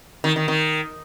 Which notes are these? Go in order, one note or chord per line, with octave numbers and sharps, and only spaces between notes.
D#3
D#3
D#3